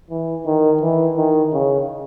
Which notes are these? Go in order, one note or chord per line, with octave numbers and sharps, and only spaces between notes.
E3
D#3
E3
D#3
C#3